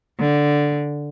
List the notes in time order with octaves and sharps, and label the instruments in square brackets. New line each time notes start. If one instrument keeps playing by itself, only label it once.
[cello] D3